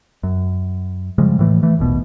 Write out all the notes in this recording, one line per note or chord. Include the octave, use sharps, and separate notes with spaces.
F#2
C#3 F3 G3 G#3
A2 E3 A3
E3 A3
D#1 A#1 B2